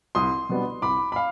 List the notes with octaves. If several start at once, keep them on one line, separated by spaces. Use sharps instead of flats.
C2 C6 D#6
B2 G3 B3 D4
C2 B5 D6
B5
F5